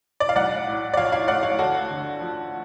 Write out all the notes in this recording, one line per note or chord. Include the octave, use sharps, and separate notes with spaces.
D5
F5
B1 D5 F#5
A2
D5
F3 C#5 F5
C#5 F5
A3 D5 F#5
C#5 F5
D2 F#4 A4
D3
F3